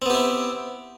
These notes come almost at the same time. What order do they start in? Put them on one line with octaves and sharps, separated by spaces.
C4 B3 G4 E4